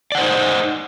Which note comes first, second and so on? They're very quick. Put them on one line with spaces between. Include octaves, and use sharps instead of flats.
D5 F#5 C5 D#4